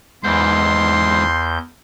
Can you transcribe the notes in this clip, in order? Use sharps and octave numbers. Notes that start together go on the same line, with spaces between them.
E2 G#2 E3 C6 G6